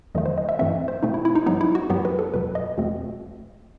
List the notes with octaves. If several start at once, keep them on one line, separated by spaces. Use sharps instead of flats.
E2 D#3 F#3 A3 D#5
C5
D#5
E5
G2 E3 A3 C4 E5
C5
B2 A3 C4 D#4
E4
E4
D#4
G2 F#3 B3 D#4
E4
F#4
F#2 F#3 B3 G4
B4
A4
E2 B2 F#3 B4
D#5
E2 B2 A3 C4